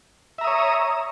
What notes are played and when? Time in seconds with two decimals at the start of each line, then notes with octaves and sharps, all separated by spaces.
0.38 E5
0.41 A#5
0.44 D#6
0.47 C#5